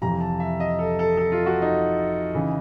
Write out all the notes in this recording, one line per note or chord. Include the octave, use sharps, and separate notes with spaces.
F2 C3 E3 A#5
A5
E5
D#5
A4
A4
A4
F4
F#4
D#4
C#3 E3